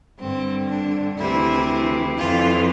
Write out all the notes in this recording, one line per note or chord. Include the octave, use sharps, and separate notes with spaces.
G2 D3 C4
D4
D2 C3 E3 E4
F2 E3 F4